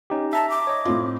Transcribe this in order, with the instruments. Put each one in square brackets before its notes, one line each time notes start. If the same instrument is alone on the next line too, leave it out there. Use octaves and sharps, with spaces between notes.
[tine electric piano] C#4 D#4 G4
[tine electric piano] E5 A#5 [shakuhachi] A5
[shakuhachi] D6
[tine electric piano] C#5 D#5
[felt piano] A2 C4 F4